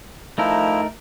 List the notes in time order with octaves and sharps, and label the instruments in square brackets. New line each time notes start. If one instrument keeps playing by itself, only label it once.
[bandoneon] F3 E4 [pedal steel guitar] A3 D#4 A#4